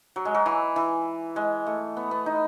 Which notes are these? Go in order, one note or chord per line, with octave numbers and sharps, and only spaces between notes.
F#3
G#3
F#3
E3
E3
G#3
A3
B3
B3
D#4